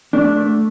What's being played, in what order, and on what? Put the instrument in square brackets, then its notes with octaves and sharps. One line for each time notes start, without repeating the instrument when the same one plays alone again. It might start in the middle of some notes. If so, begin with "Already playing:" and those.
[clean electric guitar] A3 D4
A3